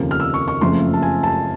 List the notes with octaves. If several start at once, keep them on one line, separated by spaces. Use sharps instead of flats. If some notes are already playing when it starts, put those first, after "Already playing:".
Already playing: F1 D#2 C#3 F3 A#3
F6
E6
C#6
C#6
F#1 F2 C#3 F3 A3 C6
A5
G#5
A5